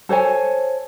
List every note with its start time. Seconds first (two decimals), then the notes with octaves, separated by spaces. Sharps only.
0.09 A4 C5 C#5 G#5